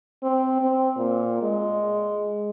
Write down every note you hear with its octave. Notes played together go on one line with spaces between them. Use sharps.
C4
C4
A#2
G#3